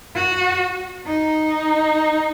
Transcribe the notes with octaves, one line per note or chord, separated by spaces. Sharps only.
F#4
D#4